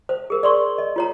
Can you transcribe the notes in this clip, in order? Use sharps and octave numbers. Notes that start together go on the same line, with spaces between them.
C5
G#4 A#4
D5 C6 C#6
D#5
F4 C#5 A#5